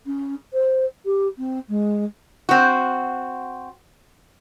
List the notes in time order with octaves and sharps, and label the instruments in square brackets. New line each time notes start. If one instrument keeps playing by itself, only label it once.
[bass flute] C#4
C5
G4
C4
G#3
[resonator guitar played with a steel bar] C4 F#4